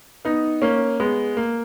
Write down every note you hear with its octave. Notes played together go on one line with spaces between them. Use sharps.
B3 D#4
A#3 C#4
G#3 B3
A#3